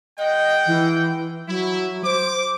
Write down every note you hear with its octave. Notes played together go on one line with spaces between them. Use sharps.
G#3 D#5 F#5 G5
E3
F#3 E4
C5 D6